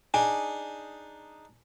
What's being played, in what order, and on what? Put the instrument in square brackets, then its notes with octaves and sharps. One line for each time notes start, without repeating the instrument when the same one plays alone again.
[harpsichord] D4 D#4 G#4 [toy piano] G#5